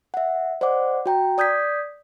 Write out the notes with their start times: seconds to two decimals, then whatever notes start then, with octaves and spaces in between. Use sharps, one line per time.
0.14 E5 F#5
0.61 C5 D5 D#5 F#5 D6
1.06 F#4 G5 A#5
1.38 D5 D#6 G6 G#6 B6